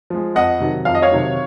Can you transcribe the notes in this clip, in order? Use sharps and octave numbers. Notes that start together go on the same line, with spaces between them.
F3 G#3
F2 D#5 F#5
C3 D#3 F#3
F2 F5
D#5
C#5 F5
C3 D#3 F#3